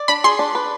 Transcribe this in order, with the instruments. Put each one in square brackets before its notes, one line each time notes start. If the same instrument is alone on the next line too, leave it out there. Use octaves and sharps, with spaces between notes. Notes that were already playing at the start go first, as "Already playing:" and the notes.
Already playing: [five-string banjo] D5
[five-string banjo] D4 [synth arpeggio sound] B5
[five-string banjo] G#4 [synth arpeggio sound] C6
[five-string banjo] D4
B4